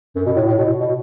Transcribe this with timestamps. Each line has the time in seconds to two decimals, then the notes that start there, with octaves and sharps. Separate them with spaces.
0.16 F#2
0.26 B2
0.36 A2
0.47 A2
0.58 B2
0.80 B2